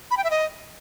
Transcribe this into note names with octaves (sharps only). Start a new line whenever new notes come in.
B5
G5
E5
D#5